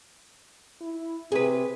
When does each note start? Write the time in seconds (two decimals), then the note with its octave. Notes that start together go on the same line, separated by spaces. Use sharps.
0.81 E4
1.32 C3 G#4 B4